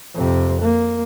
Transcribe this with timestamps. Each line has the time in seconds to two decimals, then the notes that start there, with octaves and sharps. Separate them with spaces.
0.14 F2 C3
0.62 A#3